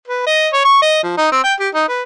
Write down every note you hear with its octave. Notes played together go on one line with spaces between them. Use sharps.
B4
D#5
C#5
C#6
D#5
F3
D#4
C4
G5
G4
D#4
B4